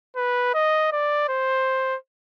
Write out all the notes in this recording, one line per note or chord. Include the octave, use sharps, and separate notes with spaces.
B4
D#5
D5
C5